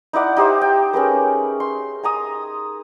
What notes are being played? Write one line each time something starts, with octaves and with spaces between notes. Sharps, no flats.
D#4 E4 D5 F#5
D#4 G4 C5 E5
G5
C#4 G#4 A#4 B4
C6
G#5 A#5 D#6